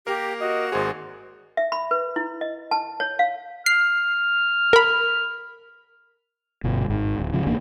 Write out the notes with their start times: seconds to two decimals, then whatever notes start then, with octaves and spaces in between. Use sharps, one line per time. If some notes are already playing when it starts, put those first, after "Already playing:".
0.07 A#3 G4 A#4
0.41 F#4 D#5
0.72 G#1 A#3 G#4 C5
1.57 E5
1.72 B5
1.91 B4
2.16 E4
2.41 D#5
2.71 A5
3.00 C#5
3.19 F5
3.66 F6 C7
4.73 A#4 B5
6.64 G1 B2
6.90 G#1 G#2
7.19 D1
7.33 G#2 C#3 F3
7.46 G1 E2 A#3 D4